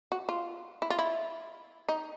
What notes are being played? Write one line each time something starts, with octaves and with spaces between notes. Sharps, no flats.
F#4
F4
E4
F4
E4
D#4